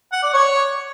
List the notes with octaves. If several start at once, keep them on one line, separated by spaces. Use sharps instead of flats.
F#5
D5
C#5